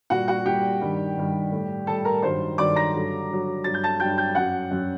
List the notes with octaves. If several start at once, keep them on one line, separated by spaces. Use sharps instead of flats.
A#2 G3 F#4 F#5
F#4 F#5
A#2 G3 G4 G5
G2 D#3 G3
G2 D#3 G3
A2 G3
A2 G3 A4 A5
A#4 A#5
G2 D#3 F#3 C5 C6
G2 D#3 F#3 D5 D6
A#5 A#6
G2 D3 F#3
G2 D3 F#3
G2 F#3 A6
G6
A5 A6
G2 F#3 G5 G6
G5 G6
F#2 F#3 F#5 F#6
F#2 F#3